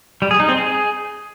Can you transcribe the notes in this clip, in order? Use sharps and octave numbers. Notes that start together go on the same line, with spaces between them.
G3
G#4
D#4
C4
G#4